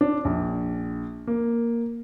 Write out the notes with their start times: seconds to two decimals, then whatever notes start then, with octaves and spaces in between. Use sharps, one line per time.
0.01 D4
0.25 A#1
1.27 A#3